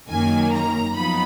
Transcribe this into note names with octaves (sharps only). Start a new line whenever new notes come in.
F#2 D#3 A#3 G#5
A#5
F#2 F3 B3 D#4 B5